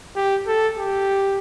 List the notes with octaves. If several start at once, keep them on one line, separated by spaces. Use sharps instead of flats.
G4
A4
G4